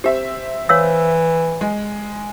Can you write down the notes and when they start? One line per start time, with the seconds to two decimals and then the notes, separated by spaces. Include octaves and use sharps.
0.04 C4 G4 E5
0.69 E3 C#5 F5 E6
1.61 G#3